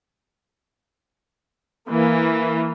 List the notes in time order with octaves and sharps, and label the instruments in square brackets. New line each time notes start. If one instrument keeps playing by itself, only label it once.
[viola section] E3 A#3